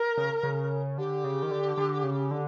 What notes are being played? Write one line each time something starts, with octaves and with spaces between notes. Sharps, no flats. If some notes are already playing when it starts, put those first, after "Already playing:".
Already playing: A#4
C#3
C#3
D3 G4
C#3
D#3
D3
D3
C#3
D3